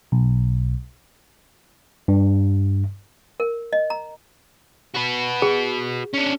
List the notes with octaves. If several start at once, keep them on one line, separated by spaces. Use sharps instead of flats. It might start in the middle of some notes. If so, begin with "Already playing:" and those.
B1
G2
A#4
D#5
A#5
F#4 B4
G#4
C#4 D4